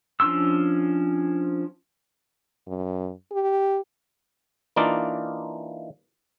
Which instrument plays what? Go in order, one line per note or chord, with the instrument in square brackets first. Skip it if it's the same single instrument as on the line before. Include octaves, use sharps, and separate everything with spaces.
[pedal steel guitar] F3 C#4 D4 C6 E6
[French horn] F#2
G4
[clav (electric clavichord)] E3 A#3 D4 D#4 F4 D5